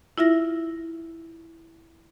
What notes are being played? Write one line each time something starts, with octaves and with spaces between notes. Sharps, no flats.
E4 F4 E5 A#6